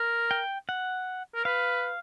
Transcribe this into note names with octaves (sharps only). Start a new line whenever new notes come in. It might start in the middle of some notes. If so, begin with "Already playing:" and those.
Already playing: A#4
G5
F#5
A#4
B4 F5